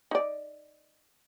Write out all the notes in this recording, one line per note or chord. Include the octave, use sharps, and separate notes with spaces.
D#4 D5